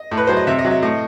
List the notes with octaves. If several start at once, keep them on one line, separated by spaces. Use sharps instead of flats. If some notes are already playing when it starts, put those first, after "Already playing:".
Already playing: D#5
A2
B4
F#3 C5
D#5
C3 E5
D#5
F#3
E5
A2 D#5